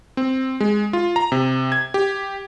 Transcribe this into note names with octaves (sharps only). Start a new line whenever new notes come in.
C4
G#3
F4
A#5
C3
G#6
G4